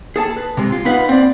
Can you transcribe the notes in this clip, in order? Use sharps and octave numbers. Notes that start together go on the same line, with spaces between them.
G#4 A4 G#5 A5
B4
C3 G#3
F4
B3 D#4 B4 F5 F#5
C4 D5